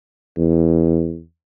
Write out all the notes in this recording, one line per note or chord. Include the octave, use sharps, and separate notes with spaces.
E2